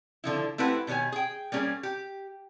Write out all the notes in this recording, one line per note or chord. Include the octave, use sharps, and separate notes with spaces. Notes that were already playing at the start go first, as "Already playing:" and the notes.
D3 F3 E4
A3 C4 E4 G4 B4 F#5
B2 D#3 G4 C#5 G#5
G#4 G5
G3 A#3 C#4 G#4
G4